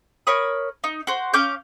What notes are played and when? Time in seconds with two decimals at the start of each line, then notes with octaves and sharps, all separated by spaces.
0.27 A#4 C#5 B5 D#6
0.84 D#4
1.07 F#4 C5
1.34 C#4 F5 D6 G6